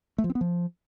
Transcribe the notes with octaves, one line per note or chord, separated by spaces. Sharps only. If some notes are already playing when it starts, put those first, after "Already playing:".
A3
F3
C4
B3
F3